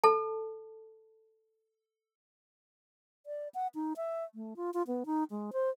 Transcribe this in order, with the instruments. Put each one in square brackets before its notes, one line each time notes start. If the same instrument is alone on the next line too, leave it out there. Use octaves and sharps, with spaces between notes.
[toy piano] A4 A5
[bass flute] D5
F#5
D#4
E5
A3
F4
F4
B3
D#4
G#3
C5